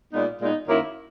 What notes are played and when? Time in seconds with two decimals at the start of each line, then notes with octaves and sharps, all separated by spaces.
0.11 A#2 G#3 B3 D#4
0.40 A#2 G#3 B3 D#4
0.68 F#2 D#3 F#3 A#3 E4